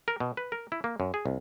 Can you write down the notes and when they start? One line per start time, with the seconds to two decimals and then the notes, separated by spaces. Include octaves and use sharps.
0.08 A#4
0.20 B2
0.37 B4
0.52 A#4
0.72 E4
0.84 A#3
1.00 F#2
1.14 G#4
1.26 C2